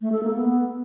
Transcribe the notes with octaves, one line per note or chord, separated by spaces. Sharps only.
A3
A4
A#3
B3